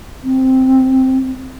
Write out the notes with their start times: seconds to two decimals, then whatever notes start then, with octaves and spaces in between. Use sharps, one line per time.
0.23 C4